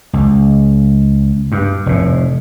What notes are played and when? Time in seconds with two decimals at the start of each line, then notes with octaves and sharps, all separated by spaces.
0.13 C#2
1.52 G2
1.86 F1 A2